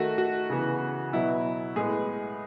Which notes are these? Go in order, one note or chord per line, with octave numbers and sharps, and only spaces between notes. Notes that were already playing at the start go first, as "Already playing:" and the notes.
Already playing: D#3 A3 F#4
F#4
C#3 E3 B3
B2 F#3 B3 E4
A2 G#3 B3 G#4